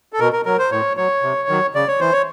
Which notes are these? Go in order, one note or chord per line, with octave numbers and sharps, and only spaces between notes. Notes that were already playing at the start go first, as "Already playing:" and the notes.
A4
B2 A#4
A#4
F#3 A#4
C5
A2 C#5
F#3 C#5
C3
D#3 F#3
C#3 D5
C#5
E3 C5
C#5